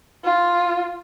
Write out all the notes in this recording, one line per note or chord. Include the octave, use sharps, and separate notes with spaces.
F4